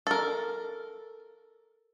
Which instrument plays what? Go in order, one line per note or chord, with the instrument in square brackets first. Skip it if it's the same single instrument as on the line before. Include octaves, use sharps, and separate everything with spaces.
[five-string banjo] A4 A#4